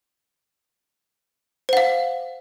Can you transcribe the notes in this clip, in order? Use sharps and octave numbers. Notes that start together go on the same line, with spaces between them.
C5 F5 F#5